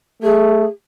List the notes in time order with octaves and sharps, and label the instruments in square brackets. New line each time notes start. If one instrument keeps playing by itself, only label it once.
[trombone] A3 [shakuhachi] G#4